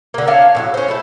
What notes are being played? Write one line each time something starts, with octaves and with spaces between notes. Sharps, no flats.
D3 A#3
D4 C#5 F5 A5
A2 D#3 F#3
C#4 C5
A3 E4 A4